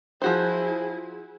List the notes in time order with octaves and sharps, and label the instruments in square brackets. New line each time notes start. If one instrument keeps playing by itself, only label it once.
[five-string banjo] F3 F#4 C5 [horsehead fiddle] E4 G#4